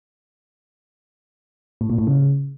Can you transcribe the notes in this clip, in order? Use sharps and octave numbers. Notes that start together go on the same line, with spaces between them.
A2
A#2
A2
C#3